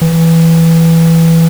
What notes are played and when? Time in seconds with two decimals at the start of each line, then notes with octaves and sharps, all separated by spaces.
0.02 E3